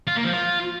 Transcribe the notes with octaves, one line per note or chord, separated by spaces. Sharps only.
F4
A#3
F3
F4